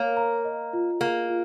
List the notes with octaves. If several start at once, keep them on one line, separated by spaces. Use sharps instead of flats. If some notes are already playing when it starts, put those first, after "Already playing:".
Already playing: A#3 A#4 C#5 F5
A#5
D#5
F4
A#3 G#4
F4